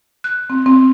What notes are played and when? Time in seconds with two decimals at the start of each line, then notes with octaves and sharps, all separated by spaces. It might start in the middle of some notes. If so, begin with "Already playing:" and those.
0.24 F#6
0.50 C4
0.66 C4